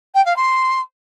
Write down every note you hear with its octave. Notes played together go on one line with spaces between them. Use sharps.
G5
F5
C6